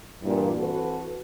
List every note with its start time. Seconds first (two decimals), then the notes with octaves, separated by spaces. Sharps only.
0.23 G2 A#2 E3
0.58 E3 C4 F#4 A4 B4